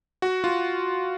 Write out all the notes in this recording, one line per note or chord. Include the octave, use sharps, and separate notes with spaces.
F#4
F4